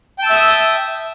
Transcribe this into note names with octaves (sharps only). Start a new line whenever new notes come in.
E5 G5 A5 D#6 E6